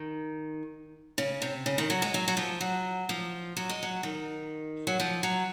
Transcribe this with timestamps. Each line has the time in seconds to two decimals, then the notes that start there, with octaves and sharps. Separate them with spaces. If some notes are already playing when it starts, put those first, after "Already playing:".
Already playing: D#3
1.18 C#3
1.42 C3
1.66 C#3
1.78 D#3
1.90 F#3
2.02 G#3
2.14 F#3
2.28 F#3
2.37 F3
2.61 F#3
3.09 F3
3.56 F#3
3.69 G#3
3.83 F#3
4.03 D#3
4.87 F#3
5.00 F3
5.23 F#3